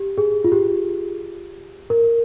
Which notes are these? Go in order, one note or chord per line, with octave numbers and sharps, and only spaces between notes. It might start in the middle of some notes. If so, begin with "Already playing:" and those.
Already playing: G4
G#4
F4
G4
A#4